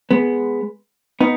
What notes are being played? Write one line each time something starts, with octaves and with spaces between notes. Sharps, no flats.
G#3 B3
B3 D#4